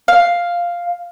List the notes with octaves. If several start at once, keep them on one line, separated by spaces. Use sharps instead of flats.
F5